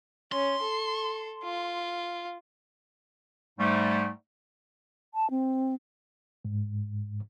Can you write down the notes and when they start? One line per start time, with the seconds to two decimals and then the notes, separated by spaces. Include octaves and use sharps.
0.32 C#4 C6
0.62 A4
1.44 F4
3.59 G#2 G3 A3
5.14 A5
5.30 C4
6.45 G#2